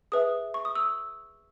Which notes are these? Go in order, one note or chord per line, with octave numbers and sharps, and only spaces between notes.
G#4 B4 E5 D#6
C#6
D#6
E6